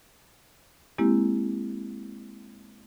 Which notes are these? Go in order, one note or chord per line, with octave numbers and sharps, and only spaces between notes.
G#3 A#3 C4 E4 G4